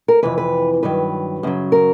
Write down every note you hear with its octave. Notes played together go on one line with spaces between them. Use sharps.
A#4
F2 C3 E3 B4
B4
G2 D#3 F#3 B4
F#2 C#3 F#3
A#4